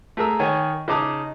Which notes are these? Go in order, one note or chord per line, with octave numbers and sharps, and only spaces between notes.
A3 G#4 A#4 E6
D#3 C#5 G#5
C#3 D#4 A5 D6 D#6